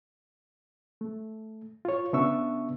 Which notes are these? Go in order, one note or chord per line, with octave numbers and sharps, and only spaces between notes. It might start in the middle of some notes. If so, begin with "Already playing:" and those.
A3
F4 C#5
C#3 B3 D4 E5 C#6 E6